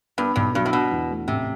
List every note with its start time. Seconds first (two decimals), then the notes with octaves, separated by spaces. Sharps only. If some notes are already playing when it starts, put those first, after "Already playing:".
0.18 G2 B3
0.36 B1 G2
0.54 G2 F#3
0.66 A2
0.72 B2 D4
0.92 E2
1.10 A3
1.28 A1 C3